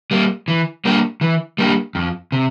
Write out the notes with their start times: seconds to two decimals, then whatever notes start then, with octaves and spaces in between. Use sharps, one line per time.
0.11 G3 A#3
0.48 E3
0.85 G3 A#3 D4 G4
1.21 E3
1.58 G3 A#3 D4 G4
1.95 F2
2.32 C3